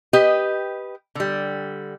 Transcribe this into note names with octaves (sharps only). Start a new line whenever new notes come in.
G4 B4 D#5
D3 G3